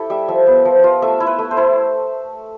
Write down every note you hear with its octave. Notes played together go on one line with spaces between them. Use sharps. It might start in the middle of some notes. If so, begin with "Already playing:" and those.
Already playing: E4 G4 A4
G3 E5
F3 E5
B3
F3
F4
A3 E5
E4
B4
A3
C5
E4